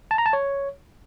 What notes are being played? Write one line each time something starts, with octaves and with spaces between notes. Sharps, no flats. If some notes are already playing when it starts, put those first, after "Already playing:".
A5
A#5
A5
C#5